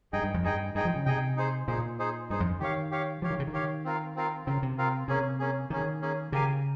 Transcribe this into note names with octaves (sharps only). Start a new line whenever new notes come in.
G2 D#4 G#4 D#5 G5
G2
F2
G2 D#4 G#4 D#5 G5
G2 D#4 G#4 D#5 G5
F3
C#3
C3 D#4 G#4 D#5 G5
D#4 G#4 C5
A#2 D#4 G#4 C5
D#4 G#4 C5
G2 D#4 G#4 C5
F2
D#3 G4 C#5 F5
G4 C#5 F5
F3 G4 C#5 F5
D#3
C#3
D#3
G4 C#5 F5
C4 F4 A#4 F5
C4 F4 A#4 F5
C#3 C4 F4 A#4 F5
C3
C4 F4 A#4 F5
C3 A#3 C#4 G#4
A#3 C#4 G#4
D#3 A#3 C#4 G#4
A#3 C#4 G#4
C#3 G4 A#4 F5 G#5